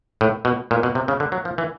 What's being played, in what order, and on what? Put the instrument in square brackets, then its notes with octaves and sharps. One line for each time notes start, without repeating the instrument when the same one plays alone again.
[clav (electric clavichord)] A2
B2
A#2
B2
C3
C#3
D3
F#3
F3
E3